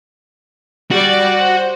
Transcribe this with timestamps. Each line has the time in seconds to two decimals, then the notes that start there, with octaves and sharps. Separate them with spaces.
0.91 G3 F#4 D5
1.39 C5